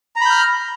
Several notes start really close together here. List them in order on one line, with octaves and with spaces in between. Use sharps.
A#5 B5 G6 F6